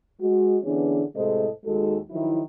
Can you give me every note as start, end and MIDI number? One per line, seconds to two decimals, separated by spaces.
0.20 0.56 56
0.20 0.56 66
0.63 1.01 50
0.63 1.01 52
0.63 1.01 59
0.63 1.01 61
0.63 1.01 62
0.63 1.01 68
1.15 1.47 45
1.15 1.47 48
1.15 1.47 56
1.15 1.47 69
1.15 1.47 72
1.15 1.47 75
1.64 1.96 39
1.64 1.96 56
1.64 1.96 63
1.64 1.96 66
1.64 1.96 69
2.09 2.39 51
2.09 2.39 53
2.09 2.39 54
2.09 2.39 64